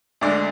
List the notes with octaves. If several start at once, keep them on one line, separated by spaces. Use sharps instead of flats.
D2 D3 G#3 D5